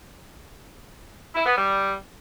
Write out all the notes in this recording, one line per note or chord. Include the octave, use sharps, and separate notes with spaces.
E4
B3
G3